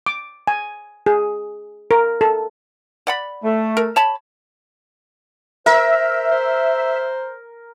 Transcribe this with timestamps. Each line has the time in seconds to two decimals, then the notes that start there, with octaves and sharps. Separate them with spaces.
0.06 D6
0.47 G#5
1.06 G#4
1.91 A#4
2.21 A4
3.07 D5 F#5 B5
3.44 A3
3.77 A#4
3.96 C#5 A5 B5
5.66 A#4 C5 E5
6.31 C5